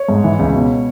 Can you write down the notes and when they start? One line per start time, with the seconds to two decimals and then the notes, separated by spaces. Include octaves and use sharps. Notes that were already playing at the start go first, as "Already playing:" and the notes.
Already playing: C#5
0.09 G#2
0.24 E3
0.39 C#2
0.54 B2